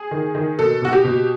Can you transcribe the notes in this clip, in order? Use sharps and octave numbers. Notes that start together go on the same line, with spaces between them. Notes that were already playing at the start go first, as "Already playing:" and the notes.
Already playing: G#4
D#3
D#3
B2 A4
B2 F#4
G4
B2